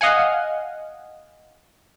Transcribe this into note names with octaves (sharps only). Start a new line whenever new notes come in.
D#5 F5 F#5 G#5